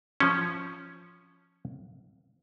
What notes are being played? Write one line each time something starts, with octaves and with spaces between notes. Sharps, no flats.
F3 C#4